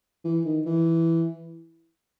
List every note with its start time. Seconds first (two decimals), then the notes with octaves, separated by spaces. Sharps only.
0.24 E3
0.45 D#3
0.66 E3